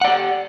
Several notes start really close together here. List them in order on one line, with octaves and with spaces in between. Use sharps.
F#5 D5 G4